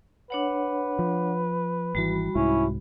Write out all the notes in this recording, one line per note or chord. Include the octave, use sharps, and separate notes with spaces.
D4 B4 C#5 F#5
F3
G#1 E3 G3 F#4 B5
C2 G#2 C#4 E4